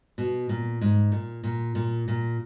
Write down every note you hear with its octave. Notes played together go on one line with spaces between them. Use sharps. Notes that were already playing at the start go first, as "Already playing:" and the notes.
B2
A#2
G#2
A#2
A#2
A#2
A#2